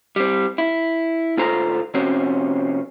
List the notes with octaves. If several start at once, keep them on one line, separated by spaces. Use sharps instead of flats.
G3 C4
E4
D2 G#2 F4 A4 C5 A#5
C3 F3 C4 C#4 F#4 C5